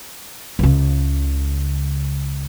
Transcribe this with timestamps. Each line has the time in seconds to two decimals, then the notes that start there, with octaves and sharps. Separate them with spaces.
0.59 C#2 C#3